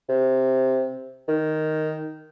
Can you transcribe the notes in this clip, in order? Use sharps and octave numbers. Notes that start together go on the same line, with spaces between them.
C3
D#3